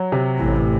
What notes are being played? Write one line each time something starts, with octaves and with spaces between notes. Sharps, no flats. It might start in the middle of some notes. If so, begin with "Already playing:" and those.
Already playing: F#3
C3
A1 A2 E3